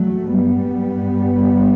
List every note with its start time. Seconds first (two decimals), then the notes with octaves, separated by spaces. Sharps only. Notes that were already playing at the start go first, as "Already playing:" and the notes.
Already playing: G2 F#3 A3
0.35 G3 B3